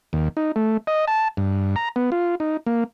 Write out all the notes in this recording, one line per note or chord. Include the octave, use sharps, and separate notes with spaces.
D#2
D#4
A3
D#5
A5
G2
A#5
B3
F4
D#4
A#3